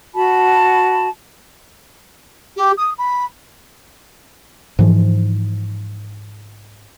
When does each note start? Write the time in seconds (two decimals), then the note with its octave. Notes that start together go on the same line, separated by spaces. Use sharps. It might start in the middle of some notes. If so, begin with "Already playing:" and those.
0.14 F#4 A5 B5
2.56 G4
2.77 D#6
2.98 B5
4.79 G#2 E3 F3